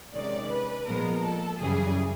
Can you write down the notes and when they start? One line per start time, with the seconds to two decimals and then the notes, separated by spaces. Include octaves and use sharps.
0.14 C3 D#3 G#3 C#4 D5
0.50 B4
0.86 A#2 F3 G#3 B3 A#4
1.23 A4
1.59 F#2 C#3 E3 G3 G#4